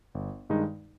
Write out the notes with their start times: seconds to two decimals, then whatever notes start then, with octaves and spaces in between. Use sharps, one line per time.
0.15 G1
0.49 G2 D#3 G#3 D#4